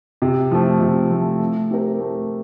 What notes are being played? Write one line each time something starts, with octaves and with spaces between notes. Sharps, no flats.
C3
F3 A3
C3
F3 A3
A3
C4 G4 A#4
A3